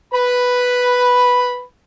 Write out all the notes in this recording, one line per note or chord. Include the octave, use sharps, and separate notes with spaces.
B4 B5